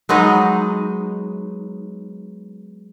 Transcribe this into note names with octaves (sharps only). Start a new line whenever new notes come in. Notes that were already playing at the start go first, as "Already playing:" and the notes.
F#3 G#3 B3 D#4